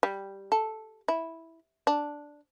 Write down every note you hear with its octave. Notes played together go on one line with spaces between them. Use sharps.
G3
A4
E4
D4